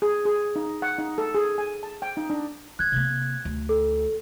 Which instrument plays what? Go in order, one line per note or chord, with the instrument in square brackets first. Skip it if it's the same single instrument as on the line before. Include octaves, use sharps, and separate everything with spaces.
[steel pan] G#4
G#4
D#4
F#5
D#4
A4
G#4
G#5
A5
G5
D#4
D4
[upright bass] D3 [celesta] F#6 G#6
[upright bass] C3 A#3
D2
[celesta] A4